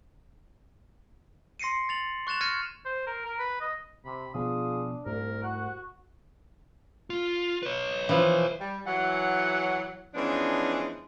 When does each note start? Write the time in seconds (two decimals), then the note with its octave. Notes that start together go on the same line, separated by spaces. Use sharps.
1.59 C6 A#6 C7 C#7 D#7
1.89 A6 F7 F#7
2.27 C#6 F#6 A6 E7 F7
2.41 F6 G#6 A#6 C#7 D#7
2.85 C5
3.07 A#4
3.25 A#4
3.39 B4
3.61 D#5
4.05 C3 B5
4.34 B2 F3 B3 D4 F4 G#4 D#6
5.06 C2 G#2 A3 A#4
5.43 F#4 F#5
7.10 F4
7.63 B4 C#5
8.09 E3 F3
8.59 G3
8.86 E3 F#3 F#5
10.14 E3 F3 G#3 B3 C#4 D4